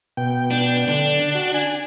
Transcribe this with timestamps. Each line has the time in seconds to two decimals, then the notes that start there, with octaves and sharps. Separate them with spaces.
0.17 B2 G5
0.51 D4
0.89 D3 D4
1.35 F#4
1.54 G#5